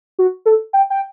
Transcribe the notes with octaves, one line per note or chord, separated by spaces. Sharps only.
F#4
A4
G5
G5